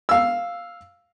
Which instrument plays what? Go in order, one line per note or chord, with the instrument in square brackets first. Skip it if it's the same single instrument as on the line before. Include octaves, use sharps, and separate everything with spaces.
[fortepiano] F5 E6